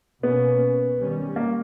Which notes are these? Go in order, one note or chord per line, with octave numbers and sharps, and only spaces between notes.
B2 A#3 B3 C#4
D#3 G3 C#4
A#3